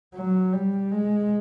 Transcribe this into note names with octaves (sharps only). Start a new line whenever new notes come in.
F#3
G3
G#3